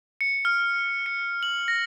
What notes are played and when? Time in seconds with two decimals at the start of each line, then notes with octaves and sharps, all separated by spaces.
0.21 C#7
0.45 F6
1.06 C#7
1.43 F#7
1.68 A#6